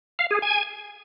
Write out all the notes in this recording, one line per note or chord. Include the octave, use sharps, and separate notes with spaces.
F5
G#4
G#5